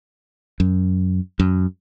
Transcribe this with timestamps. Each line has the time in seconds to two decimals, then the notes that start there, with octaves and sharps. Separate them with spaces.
0.60 F#2
1.40 F#2